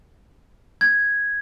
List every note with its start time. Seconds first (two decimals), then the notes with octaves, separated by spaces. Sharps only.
0.81 G#6